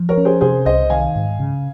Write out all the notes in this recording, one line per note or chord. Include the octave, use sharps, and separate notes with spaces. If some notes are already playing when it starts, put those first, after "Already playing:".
Already playing: F3
A#4 C#5
C#4
G#4 C5
C3 G#4 C5
C2 C5 D#5
D#3 F5 G#5
G#2
C#3